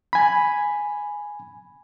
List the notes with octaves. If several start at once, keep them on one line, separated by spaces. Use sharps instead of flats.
G#5 B5